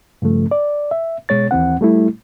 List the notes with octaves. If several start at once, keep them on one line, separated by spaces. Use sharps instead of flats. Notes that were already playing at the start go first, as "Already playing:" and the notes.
G2 C#3 F3 A3
D5
E5
B2 G#3 C#5 A6
D#2 E3 C4 F#5
G3 A3 E4